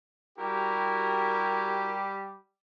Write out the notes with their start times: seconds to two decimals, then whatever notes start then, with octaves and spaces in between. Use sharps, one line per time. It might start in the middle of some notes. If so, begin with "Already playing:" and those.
0.39 G3 E4 F#4 G4 A#4